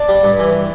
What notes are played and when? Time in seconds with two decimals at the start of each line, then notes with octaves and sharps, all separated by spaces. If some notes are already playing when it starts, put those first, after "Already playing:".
Already playing: D4
0.09 G3
0.23 G2
0.39 E3